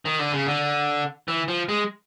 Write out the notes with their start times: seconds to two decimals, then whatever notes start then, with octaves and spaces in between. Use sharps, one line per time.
0.05 D#3
0.19 D3
0.32 C#3
0.46 D3
1.28 E3
1.48 F3
1.69 G#3